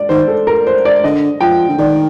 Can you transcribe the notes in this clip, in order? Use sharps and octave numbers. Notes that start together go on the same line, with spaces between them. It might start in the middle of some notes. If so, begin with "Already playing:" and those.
Already playing: D5
D#3 C5
A4
A#4
C5
D5
D3 D#5
F3 G5
D3
D#3 D5